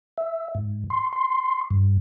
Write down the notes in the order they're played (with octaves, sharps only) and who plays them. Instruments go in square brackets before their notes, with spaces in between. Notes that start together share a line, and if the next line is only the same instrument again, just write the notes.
[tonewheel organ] E5
G#2
C6
C6
G2